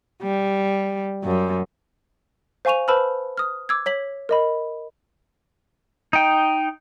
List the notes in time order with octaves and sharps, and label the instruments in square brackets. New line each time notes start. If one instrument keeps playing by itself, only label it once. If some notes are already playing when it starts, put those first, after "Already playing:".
[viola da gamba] G3
F#2
[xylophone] C5 F5 G#5 C#6 D#7 F7
B4 C5 A5 B5 E6 F6
D#6 F6
D6 E6 G#6
C#5 B6 F#7
A#4 D#5 B5
[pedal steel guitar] D#4 G5